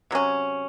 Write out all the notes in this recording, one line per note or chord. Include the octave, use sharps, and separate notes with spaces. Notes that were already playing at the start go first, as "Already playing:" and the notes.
C3 F#3 C#4